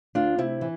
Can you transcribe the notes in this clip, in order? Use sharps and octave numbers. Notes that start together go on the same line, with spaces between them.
D2 D4 F4
C3 E4
E3